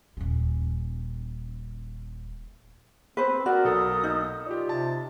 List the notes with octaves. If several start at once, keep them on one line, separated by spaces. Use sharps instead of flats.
D#1 C#4
C4 B4 C5
F#4 A#4 D5
B1 A4 D#6
D#4
F4 G4 D5
C3 A5